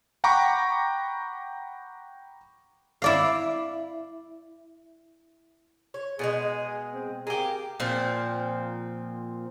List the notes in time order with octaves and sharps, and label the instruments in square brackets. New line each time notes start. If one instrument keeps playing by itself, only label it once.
[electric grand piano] F#5 G5 A#5 B5 C#6 D6
[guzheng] E4 D5 F5
[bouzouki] C#5
[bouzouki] B2 D#3 G#3 [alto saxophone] G#4
[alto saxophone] C4
[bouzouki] A#3 G4 [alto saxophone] G#4
[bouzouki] A#2 F3 C4